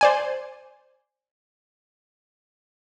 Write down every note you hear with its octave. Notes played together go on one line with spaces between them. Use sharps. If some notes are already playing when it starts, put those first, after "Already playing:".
C5 D5 G#5